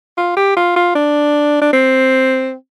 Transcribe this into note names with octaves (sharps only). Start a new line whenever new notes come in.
F4
G4
F4
F4
D4
D4
C4